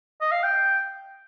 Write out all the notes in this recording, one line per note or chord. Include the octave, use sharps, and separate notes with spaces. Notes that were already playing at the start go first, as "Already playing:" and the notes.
D#5
F5
G5